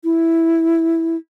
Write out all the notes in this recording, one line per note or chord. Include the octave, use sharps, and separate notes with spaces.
E4